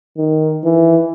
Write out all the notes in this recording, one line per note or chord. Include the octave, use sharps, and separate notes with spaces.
D#3
E3